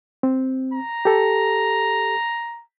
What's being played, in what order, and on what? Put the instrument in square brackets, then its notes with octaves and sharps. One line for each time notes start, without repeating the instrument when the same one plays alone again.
[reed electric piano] C4
[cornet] A#5
[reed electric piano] G4 A4